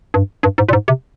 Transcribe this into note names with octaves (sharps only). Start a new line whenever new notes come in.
G2
G2
G#2
A#2
G#2
C3